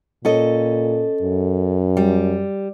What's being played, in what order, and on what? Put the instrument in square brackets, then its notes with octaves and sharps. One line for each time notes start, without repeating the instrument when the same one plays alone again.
[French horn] A#2 [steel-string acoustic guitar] C#4 A4 D#5
[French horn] F#2
[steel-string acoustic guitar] G3